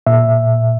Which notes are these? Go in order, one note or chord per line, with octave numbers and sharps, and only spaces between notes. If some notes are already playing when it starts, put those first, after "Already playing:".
A#2 E5